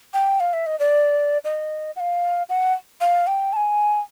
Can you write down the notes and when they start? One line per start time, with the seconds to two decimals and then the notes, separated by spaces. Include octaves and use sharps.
0.14 G5
0.40 F5
0.53 E5
0.66 D#5
0.79 D5
1.44 D#5
1.96 F#5
2.00 F5
2.49 F#5
3.01 F5
3.27 G5
3.53 A5
3.56 G#5